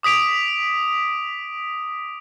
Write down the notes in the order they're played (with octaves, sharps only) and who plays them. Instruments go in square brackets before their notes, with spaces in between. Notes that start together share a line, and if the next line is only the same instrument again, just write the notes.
[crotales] D6 D#6 B6 D7 F7